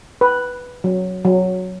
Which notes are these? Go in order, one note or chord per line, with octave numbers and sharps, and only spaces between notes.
B4
F#3
F#3